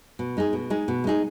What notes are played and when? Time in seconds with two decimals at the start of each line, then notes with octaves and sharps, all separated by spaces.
0.19 B2
0.37 G#3 D#4 G#4
0.53 B2
0.70 G#3 D#4 G#4
0.88 B2
1.04 G#3 D#4 G#4